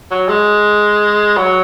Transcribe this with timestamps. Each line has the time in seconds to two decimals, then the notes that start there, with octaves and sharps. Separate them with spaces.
0.11 F#3
0.29 G#3
1.37 F#3